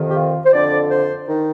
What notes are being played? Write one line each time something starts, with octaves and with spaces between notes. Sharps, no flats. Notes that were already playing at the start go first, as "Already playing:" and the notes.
Already playing: F2 C3 D#3
G4
F4
C5
F2 D3 D5
C5
D#3